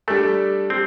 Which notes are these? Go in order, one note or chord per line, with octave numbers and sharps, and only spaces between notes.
G3 A3 D4 A4
G3 C4